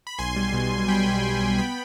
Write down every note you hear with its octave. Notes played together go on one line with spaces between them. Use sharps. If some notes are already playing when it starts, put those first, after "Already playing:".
B5
B1 G#5 C6
G3
B2
B2
G3 G5 B5
B1
B1
B1
C6
B3 G5 B5